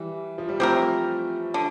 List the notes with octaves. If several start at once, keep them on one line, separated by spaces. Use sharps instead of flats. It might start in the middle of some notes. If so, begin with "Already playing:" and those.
Already playing: E3 G3
F3
G3
F3 A3 C4 G4 A#4
D3